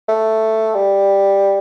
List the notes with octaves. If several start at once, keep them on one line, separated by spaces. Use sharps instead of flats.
A3
G3